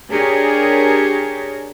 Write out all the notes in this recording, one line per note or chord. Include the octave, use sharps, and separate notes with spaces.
D4 G4 G#4 A#4 C#5